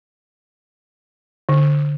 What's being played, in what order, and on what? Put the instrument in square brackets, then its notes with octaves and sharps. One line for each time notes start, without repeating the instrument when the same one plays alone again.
[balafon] D3